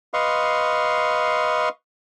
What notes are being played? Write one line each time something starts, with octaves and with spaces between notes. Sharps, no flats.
B4 D#5 F5 C6 C#6